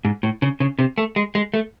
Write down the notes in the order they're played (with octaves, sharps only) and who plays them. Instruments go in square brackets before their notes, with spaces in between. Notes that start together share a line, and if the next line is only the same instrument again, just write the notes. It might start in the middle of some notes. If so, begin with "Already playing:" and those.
[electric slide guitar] G#2
A2
C#3
C#3
C3
A3
G#3
G#3
A3